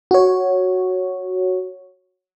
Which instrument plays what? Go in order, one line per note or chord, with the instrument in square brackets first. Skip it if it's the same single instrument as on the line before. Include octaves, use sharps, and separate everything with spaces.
[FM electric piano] F#4 C#5